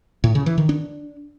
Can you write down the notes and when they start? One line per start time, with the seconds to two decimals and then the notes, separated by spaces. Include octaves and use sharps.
0.24 A2
0.35 C#3
0.46 E3
0.58 D#3
0.69 D4